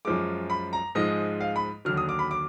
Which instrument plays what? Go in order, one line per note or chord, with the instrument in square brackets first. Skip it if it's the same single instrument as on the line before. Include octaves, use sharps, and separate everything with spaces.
[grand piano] F#2 F3 G#3 D6
B5
A#5
G#2 F3 G#3 D#5
F5
B5
D#2 D3 F#3 F6
D#6
D6
B5
D6